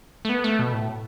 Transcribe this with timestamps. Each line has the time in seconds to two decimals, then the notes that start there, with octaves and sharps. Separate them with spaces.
0.25 A3
0.29 B3
0.44 A3
0.59 B2
0.73 A2